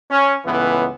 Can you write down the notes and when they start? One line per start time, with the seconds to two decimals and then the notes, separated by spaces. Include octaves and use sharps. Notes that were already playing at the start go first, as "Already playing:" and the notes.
0.11 C#4
0.45 C#2 A2 E3 B3